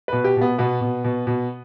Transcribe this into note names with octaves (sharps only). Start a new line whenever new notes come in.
B2 B4
G4
B2 B3
B2 B3
B2
B2
B2